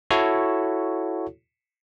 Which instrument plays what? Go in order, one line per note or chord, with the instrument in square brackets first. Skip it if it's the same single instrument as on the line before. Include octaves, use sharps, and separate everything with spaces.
[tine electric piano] E4 F#4 A4 C#5